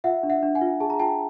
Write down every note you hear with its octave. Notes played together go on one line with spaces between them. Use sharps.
F4 E5 F#5
D4
E5 F#5
D4
F#5 G#5
F4
G#4 A5
A#5
F4 G5 A5